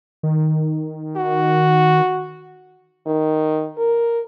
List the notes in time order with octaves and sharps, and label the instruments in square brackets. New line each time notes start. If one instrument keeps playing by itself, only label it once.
[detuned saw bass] D#3
[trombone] F#4
[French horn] D#3
A#4